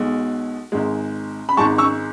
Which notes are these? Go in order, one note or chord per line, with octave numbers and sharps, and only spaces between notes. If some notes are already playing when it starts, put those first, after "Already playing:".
Already playing: B1 B2 G#3
G#1 G#2 G#3
B5
G#1 G#2 G#3 A5 C#6
C#6 E6